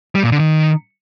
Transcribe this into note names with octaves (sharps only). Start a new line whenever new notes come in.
G3
A#2
D3
D#3